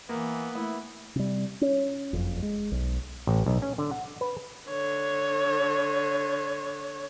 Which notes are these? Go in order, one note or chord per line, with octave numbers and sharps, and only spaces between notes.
E3 A#3 B3
A3 E4
C3 G3
C#4
F#1 F2
G#3
B1
A1
B1
C#4
D3
F#5
B4
D3 C#5